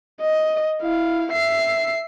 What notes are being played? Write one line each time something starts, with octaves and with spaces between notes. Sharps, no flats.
D#5
E4 F5
E5 C7